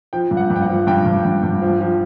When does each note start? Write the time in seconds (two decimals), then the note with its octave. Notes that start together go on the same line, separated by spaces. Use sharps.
0.13 F3 G5
0.31 G2
0.37 F#5
0.50 G2
0.56 G5
0.62 F#5
0.68 F3
0.87 G2 G5
1.06 G2
1.25 G2
1.43 G2
1.62 F3
1.81 F3